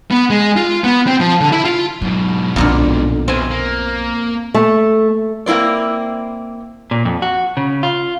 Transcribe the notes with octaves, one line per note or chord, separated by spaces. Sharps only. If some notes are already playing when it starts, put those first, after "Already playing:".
B3
G#3
F4
B3
C4
F3
D3
E4
F4
G#2 B2 F#3
B1 F2 A#2 D3 B3
B2 F3 C4 G#5
A#3
A3
A#3 C4 E4 C5 D5
A#2
F2
F#4
C#3
F4